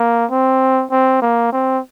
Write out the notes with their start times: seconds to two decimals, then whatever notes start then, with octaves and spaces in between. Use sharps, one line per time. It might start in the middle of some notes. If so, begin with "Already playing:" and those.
Already playing: A#3
0.31 C4
0.91 C4
1.22 A#3
1.52 C4